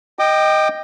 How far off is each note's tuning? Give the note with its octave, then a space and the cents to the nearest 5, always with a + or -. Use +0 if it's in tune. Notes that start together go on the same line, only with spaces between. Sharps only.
D#5 +0 G5 +0 D6 +40